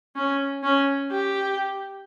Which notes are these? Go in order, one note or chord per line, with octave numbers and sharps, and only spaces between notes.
C#4
C#4
G4